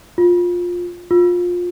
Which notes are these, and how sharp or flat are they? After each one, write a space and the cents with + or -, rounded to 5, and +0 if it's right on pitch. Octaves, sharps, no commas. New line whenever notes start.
F4 +15
F4 +20